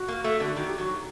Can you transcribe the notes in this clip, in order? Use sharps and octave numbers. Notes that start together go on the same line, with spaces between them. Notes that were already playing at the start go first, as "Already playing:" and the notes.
Already playing: F#4
A#3
A3
D3
D#3 F#4
G4
F#3 F#4